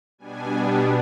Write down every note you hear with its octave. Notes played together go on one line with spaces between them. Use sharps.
B2 G3 B3 D4 G#5